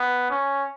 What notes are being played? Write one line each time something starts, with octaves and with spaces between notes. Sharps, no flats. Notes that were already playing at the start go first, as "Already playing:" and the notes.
Already playing: B3
C#4